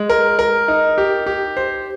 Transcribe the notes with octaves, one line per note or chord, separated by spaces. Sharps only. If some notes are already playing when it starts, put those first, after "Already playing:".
Already playing: G#3
A#4
A#4
D#4
G4
G4
C5